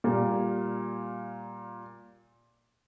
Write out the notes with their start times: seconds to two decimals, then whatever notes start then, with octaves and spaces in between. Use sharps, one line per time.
0.04 A#2 G3 A#3